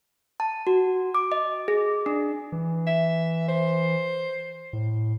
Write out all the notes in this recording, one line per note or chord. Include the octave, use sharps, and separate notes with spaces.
A5
F#4
D6
D#5
G#4
D4
E3
E5
C5
A2